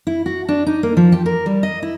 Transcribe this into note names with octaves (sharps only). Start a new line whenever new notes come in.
E4
F#4
D4
D#4
A#3
F3
G4
A#4
G3
D#5
E4